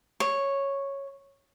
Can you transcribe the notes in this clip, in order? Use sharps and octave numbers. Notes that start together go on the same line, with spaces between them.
C#5